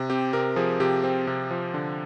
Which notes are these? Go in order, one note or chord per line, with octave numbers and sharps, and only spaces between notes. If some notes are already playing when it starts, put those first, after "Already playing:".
Already playing: C3
C4 G4
C3 A#4
F3 G#4
C3 G4
C4
C3
F3
D3